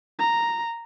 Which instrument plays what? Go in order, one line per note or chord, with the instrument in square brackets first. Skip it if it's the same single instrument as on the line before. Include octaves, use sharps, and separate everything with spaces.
[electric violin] A#5